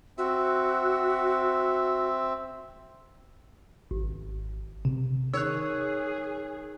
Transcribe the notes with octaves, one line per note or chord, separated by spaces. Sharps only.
C4 F#4 E5
G#1
C3
D#3 G#4 C#5 E6 F#6